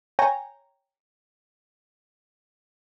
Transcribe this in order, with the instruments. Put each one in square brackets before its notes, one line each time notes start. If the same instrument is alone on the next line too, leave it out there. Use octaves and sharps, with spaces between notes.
[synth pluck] C#5 G5 G#5 A#5